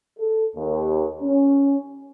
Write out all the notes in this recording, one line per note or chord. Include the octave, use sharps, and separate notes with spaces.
A4
D#2
C#4